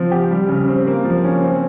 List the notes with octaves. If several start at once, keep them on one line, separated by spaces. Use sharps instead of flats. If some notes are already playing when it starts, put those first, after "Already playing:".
Already playing: F3 C4
G4
G3
C#3
C4
A#3
F3
C#4
C4